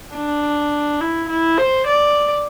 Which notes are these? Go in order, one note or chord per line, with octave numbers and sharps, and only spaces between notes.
D4
E4
E4
C5
D5